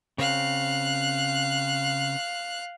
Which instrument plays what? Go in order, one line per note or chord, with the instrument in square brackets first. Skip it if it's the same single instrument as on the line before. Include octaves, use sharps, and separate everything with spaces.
[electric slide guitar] C#3 C4 [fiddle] F5 F#6